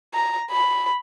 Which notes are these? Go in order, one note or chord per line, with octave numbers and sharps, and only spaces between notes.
A#5
B5